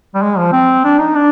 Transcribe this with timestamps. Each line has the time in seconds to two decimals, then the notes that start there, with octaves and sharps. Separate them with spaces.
0.15 G3
0.22 G#3
0.38 F3
0.52 C4
0.84 D4
0.99 D#4
1.15 D4